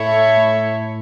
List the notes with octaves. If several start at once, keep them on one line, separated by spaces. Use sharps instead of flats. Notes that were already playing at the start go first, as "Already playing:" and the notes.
Already playing: A2 E4 A4 C#5 E5
A2